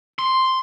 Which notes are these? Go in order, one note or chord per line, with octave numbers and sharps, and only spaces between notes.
C6